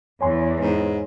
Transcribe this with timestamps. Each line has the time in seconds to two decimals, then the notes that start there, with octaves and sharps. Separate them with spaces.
0.21 E2 E3 C#5 G#5 C6
0.60 G#2